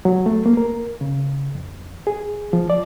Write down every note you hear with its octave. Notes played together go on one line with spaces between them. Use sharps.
F#3
A3
A#3
A#4
C#3
F2
G#4
F3
D5